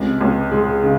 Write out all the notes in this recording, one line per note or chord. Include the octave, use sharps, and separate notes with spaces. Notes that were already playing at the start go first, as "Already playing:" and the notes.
Already playing: C#2 C3
C#2
G#3
C#3